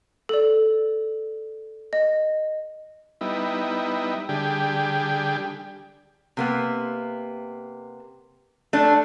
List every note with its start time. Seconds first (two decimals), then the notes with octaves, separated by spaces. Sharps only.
0.29 A4 D5
1.93 D#5
3.21 G3 B3 D#4 E4
4.29 D3 G3 G4 G#4
6.37 C3 A#3 B3
8.73 A3 D4